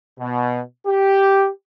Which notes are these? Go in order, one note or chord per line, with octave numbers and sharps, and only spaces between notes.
B2
G4